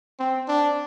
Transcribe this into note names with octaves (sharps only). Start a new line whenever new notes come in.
C4
D4